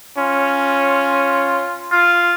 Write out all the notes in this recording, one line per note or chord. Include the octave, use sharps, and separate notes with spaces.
C#4 F4
F4